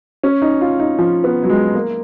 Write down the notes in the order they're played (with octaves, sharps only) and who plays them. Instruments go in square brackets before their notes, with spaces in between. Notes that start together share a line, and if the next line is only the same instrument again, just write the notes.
[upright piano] C#4
D#4
F4
D#4
F3
B3
F#3
G#3
A#3